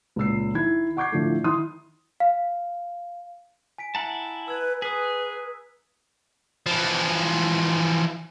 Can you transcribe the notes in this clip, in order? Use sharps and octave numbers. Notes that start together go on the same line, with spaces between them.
C#2 A#2 E6 C7
D#3 E4 G#6
F#5 C#6 D6 G6 G#6 C7
A2 D3 F3 A3
D#3 E4 C6 D#6
F5
G#5 B6 D7
E4 F#5 A5 A#5
B4 E6 G#6
G#4 B4 D#6 B6
E3 F3